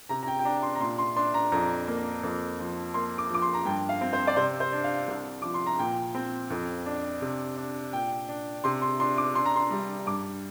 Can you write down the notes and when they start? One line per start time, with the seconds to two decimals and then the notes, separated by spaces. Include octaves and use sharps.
0.09 C3 A#5
0.23 A#5
0.27 G5
0.39 G5
0.45 D4 A#5
0.63 C6
0.75 A#5
0.80 A#2 C6
0.99 C6
1.16 D4 C6
1.34 A#5
1.52 F2 A#5
1.88 A#3
2.23 F2
2.59 F3
2.94 A#3 C6
3.18 D6
3.30 F3 D6
3.42 C6
3.54 A#5
3.65 G2 G5
3.89 F5
4.01 C4
4.13 C5
4.27 D5
4.36 C3 C5
4.60 C5
4.72 D4
4.84 F5
5.08 C2
5.42 F3 D6
5.54 C6
5.67 A#5
5.79 A#2 G5
6.15 C4
6.50 F2
6.86 D4
7.22 C3
7.57 D4
7.92 A#2 G5
8.29 D4
8.64 C3 C6
8.82 C6
9.00 D4 C6
9.18 D6
9.35 D4 C6
9.45 A#5
9.56 C6
9.70 G3
10.06 G2 D6